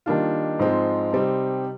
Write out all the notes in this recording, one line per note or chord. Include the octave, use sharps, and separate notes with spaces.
D#3 G3 A#3 D4 F4
G#2 F3 G#3 C4
C3 G3 C4 D#4